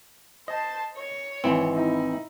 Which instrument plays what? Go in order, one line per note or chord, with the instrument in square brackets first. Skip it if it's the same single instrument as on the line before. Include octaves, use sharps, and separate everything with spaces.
[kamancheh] C5 A5 [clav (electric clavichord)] D#5
[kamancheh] C#5
[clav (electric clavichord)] G#1 E3 C4
[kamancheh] D#4 E4